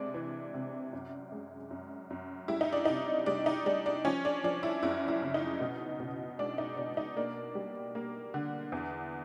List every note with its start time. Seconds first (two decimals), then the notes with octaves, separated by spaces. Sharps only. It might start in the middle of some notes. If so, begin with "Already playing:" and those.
Already playing: C3 G#3 D4
0.14 E3
0.54 C3
0.93 F#2
1.32 G#3
1.71 F#2
2.10 F#2
2.48 G3 E4
2.61 D#4
2.73 D4
2.85 C3 D#4
3.26 G3 D4
3.46 D#4
3.66 G3 D4
3.86 D4
4.05 F3 C#4
4.25 D4
4.44 F3 D4
4.63 E4
4.83 F#2 E4
5.08 E4
5.22 C#3
5.34 D#4
5.60 B2
6.00 B2
6.39 G#3 D4
6.58 D#4
6.77 B2 D4
6.97 D#4
7.16 A#3 D4
7.55 G3
7.95 A#3
8.34 D3
8.72 E2